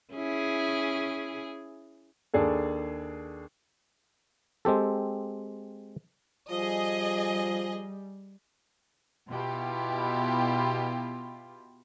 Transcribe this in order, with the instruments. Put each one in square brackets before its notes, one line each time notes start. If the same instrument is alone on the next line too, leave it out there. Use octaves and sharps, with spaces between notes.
[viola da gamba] C#4 E4 G#4
[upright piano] D#2 D4 G#4 A4
[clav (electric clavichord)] G#3 C4 G4 A4
[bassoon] F3 [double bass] G3 [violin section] G#4 D#5
[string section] B2 E4 F4 G4